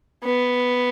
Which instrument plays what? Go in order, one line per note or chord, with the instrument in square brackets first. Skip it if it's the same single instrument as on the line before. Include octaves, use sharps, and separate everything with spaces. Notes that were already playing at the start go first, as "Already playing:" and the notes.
[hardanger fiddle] B3